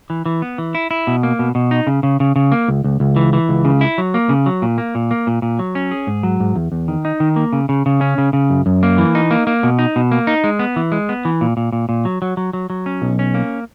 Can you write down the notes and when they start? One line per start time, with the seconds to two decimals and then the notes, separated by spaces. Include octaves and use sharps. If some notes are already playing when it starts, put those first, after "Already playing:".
0.10 E3
0.26 E3
0.42 B3
0.58 E3
0.75 E4
0.91 E4
1.07 B2
1.23 A#3
1.39 B2
1.55 B2
1.71 D#4
1.87 C#3
2.03 C#3
2.20 C#3
2.36 C#3
2.52 A#3
2.68 C#2
2.84 C#2
3.00 C#2
3.16 E3
3.33 E3
3.49 C#2
3.65 C#3
3.81 E4
3.98 F#3
4.14 A#3
4.29 C#3
4.46 F#3
4.62 A#2
4.78 A#3
4.95 A#2
5.11 A#3
5.27 A#2
5.42 A#2
5.59 F#3
5.75 C#4
5.91 G#4
6.07 G#2
6.23 F#3
6.40 G#2
6.56 E2
6.72 E2
6.88 D#3
7.05 D#4
7.20 D#3
7.36 A#3
7.53 C#3
7.69 C#3
7.86 C#3
8.01 C#4
8.18 C#3
8.33 C#3
8.50 F#2
8.66 F#2
8.83 A#3
8.98 E3
9.15 D#4
9.31 A#3
9.47 A#3
9.63 B2
9.79 D#4
9.96 B2
10.12 A#3
10.27 D#4
10.44 G#3
10.59 B3
10.76 E3
10.92 G#3
11.09 B3
11.25 E3
11.41 A#2
11.57 A#2
11.73 A#2
11.89 A#2
12.05 F#3
12.22 F#3
12.37 F#3
12.53 F#3
12.70 F#3
12.86 C#4
13.02 B1
13.19 C#4
13.34 A#3